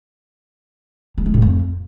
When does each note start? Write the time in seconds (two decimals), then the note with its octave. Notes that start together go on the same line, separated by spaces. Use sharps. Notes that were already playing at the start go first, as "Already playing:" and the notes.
1.18 G3
1.26 G#3
1.34 A2
1.42 F2